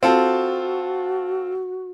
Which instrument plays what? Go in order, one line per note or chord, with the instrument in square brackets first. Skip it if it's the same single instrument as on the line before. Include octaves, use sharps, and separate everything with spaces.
[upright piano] C4 F4 A4 [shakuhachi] F#4